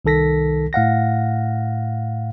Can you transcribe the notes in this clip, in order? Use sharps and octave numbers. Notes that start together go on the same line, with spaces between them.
C2 D#3 A4 A#6 B6
A2 F5 F#5 A#6